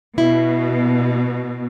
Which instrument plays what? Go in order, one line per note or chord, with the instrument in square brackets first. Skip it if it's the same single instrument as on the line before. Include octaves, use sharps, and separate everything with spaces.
[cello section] B2 [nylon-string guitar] E4